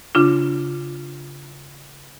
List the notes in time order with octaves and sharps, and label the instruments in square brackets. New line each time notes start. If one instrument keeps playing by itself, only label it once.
[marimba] C#3 D4 F4